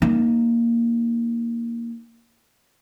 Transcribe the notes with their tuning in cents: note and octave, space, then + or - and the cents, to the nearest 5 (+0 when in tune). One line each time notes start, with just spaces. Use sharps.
A#3 +0 D#4 +0